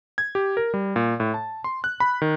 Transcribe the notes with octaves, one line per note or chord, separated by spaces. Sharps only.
G#6
G4
A#4
G3
A#2
A2
A5
C6
F#6
B5
D#3